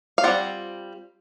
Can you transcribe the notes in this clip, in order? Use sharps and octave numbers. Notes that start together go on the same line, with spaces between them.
F5
G3 C4 F4 F#5